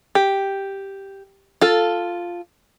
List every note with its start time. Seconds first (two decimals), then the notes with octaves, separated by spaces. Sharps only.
0.15 G4
1.61 F4 A4